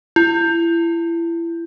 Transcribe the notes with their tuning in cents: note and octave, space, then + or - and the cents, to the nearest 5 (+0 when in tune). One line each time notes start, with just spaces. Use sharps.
E4 +30